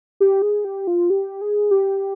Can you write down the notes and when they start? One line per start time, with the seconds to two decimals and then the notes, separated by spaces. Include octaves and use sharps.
0.20 G4
0.42 G#4
0.65 G4
0.87 F4
1.10 G4
1.41 G#4
1.71 G4